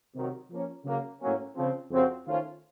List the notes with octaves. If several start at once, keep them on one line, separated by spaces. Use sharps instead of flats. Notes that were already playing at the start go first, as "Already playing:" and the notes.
C3 D#3 F#3
F3 A#3 C#4
C#3 F#3 A#3
A2 F#3 A#3 C#4
C#3 F3 C4
F2 C#3 F3 C4 F#4
D#3 A3 C#4 F4 C5